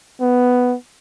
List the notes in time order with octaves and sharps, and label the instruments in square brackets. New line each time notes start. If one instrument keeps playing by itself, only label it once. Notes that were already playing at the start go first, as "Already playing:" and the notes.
[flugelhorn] B3